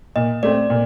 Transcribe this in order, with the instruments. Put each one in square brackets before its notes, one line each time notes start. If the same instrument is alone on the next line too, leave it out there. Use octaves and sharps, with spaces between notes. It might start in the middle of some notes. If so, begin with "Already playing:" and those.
[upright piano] A#2 [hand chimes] D#5
[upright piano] A3 C4 [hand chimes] D5
[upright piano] A#2